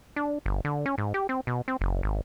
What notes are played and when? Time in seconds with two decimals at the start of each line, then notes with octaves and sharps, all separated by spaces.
0.16 D4
0.46 G1
0.65 D3
0.86 C#4
0.98 G#2
1.14 G4
1.29 C4
1.47 B2
1.68 C4
1.81 F#1
2.03 G#1